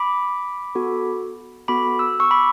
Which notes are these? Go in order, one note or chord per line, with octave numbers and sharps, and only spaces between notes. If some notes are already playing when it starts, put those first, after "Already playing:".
Already playing: B5 D6
B3 F#4 A4
B3 F#4 A4 B5 D6
E6
C#6 E6
B5 D6